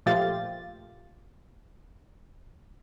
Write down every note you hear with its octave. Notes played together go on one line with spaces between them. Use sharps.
A#2 F3 A3 F4 G4 A6